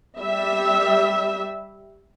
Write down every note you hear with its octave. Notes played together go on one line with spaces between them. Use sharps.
G3 E5